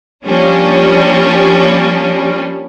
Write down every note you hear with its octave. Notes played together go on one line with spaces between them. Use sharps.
F3 G3 A#3 C#4 D4